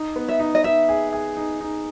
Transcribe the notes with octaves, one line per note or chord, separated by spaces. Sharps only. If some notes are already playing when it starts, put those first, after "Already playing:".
Already playing: D#4
B3
E5
D#4
D#5
D#4 E5
G#4
G#4
D#4
D#4